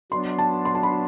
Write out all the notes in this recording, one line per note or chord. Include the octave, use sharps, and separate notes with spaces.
F#3 B3 D4 C6
A5
C6
A5
B5